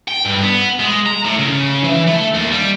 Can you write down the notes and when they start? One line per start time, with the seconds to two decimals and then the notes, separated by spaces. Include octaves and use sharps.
0.08 G5
0.25 G2
0.42 B3
0.80 G#3
1.06 A#5
1.25 A2
1.38 C#3
1.84 E3
2.07 A3
2.34 D#2
2.52 G3